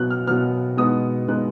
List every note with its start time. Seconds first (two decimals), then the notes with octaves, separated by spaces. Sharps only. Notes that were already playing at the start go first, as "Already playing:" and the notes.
Already playing: B2 F#3 B3 F#6
0.10 F6
0.27 B2 F#3 B3 F6
0.77 B2 G#3 B3 D#4 D#6
1.28 B2 G#3 B3 D#4 F#6